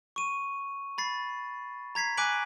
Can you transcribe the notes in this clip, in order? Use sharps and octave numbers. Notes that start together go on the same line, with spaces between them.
C#6 D#7
B5 A6 C7
A#5 G#6 B6 C7
G#5 D6 F#6 B6 D7 F#7